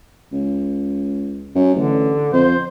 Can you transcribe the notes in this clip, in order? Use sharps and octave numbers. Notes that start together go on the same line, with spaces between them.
C#2
F#2
A1 D3
F2 C5